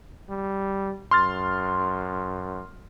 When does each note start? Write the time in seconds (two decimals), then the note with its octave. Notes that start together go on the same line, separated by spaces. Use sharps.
0.29 G3
1.11 F#2 C6 F6 A6